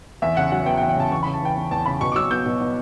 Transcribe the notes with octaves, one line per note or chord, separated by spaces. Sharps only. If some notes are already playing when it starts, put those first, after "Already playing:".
E2 E5
C#3 F#5
F#3 F#5
B3 G5
G5
E2
G5
C#3 A5
E2 C#6
B5
C#3
A5
E3 G5
E2
E2 A5
C#3 B5
B2 C#6
D6
F#3 E6
B3 G6
B2
B2